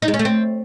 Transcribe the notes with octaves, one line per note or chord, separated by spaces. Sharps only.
D#4
G#3
C#4
A3
C4